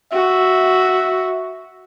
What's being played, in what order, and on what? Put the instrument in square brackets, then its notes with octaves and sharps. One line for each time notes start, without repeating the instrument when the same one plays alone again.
[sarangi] F#4 [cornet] E5